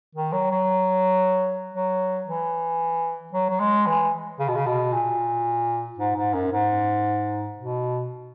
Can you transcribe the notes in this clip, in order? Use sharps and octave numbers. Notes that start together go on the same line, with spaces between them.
D#3
F#3
F#3
F#3
E3
F#3
F#3
G#3
E3
C#3
B2
C#3
B2
A#2
G#2
G#2
F#2
G#2
B2